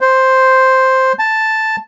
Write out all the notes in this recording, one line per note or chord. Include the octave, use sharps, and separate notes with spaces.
C5
A5